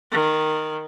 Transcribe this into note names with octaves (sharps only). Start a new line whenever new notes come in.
D#3